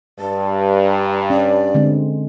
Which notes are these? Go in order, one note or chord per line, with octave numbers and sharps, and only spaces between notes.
G2 A5
A#5
C#4 D5
D3 G#3 C4